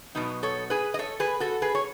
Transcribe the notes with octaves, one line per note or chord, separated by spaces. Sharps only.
B2 F#3 B3 D#4
A4 C#5
G#4 B4
D#5
A4 C#5
G#4 B4
F#4 A4
G#4 B4
C#5